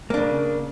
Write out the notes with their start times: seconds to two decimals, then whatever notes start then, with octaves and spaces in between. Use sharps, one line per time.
0.10 A#3
0.14 D4
0.17 C#3